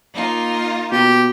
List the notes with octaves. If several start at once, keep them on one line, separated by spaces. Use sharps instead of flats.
A#3 D#4 F4
B2 G4